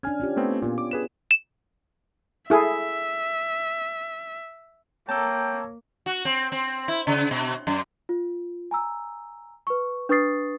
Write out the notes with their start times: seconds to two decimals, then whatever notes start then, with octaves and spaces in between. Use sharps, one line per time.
0.03 C#4 D4 G#5 F6 G#6
0.20 C#4 F4 G4
0.36 A3 B3 C4
0.62 A#2 B3 F4
0.78 D6
0.91 G#4 B4 E7
1.31 E7
2.50 E4 G#4 A4 E5
5.09 A#3 C#5 G5 A5 A#5 E6
6.06 F#4
6.25 C4
6.52 C4
6.88 E4
7.07 C#3
7.31 B2
7.67 F#2
8.09 F4
8.71 G#5 A#5 E6
9.67 B4 C#6
10.09 D4 B4 C#6 D#6 A6 C7